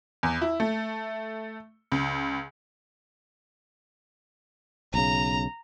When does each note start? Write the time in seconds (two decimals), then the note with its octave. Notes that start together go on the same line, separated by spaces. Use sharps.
0.23 E2
0.42 E4
0.60 A3
1.92 C#2
4.94 B1 C#3 A#5